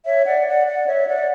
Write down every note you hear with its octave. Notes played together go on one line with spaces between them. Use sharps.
C#5 E5
D5 F#5
D5 F#5
D5 F#5
C#5 E5
D5 F#5